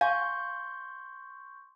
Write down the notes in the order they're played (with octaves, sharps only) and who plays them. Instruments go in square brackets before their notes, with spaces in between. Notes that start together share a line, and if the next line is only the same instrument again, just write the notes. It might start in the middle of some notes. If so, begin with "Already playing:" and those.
[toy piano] F5 [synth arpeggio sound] G#5 [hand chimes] C6 C#6 G6